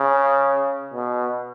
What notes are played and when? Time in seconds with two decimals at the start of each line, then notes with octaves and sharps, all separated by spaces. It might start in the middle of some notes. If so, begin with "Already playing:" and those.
Already playing: C#3
0.94 B2